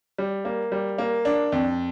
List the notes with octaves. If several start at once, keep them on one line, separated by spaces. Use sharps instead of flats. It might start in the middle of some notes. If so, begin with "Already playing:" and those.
G3
A#3
G3
A#3
D4
F2